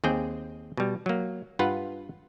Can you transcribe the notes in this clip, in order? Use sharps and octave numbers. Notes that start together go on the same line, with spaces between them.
D#2 C4 G#4 G5
B2 G3
F#3 A#3
G2 F4 B4 F#5